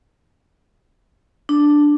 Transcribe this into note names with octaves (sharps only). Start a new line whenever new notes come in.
D4